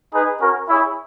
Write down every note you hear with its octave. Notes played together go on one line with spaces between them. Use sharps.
D#4 G#4 B4
C#4 F#4 A#4
E4 G#4 C#5 E5